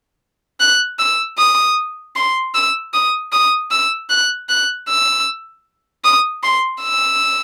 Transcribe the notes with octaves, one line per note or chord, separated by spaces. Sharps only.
F#6
E6
D#6
C6
E6
D#6
D#6
E6
F#6
F#6
E6
D#6
C6
E6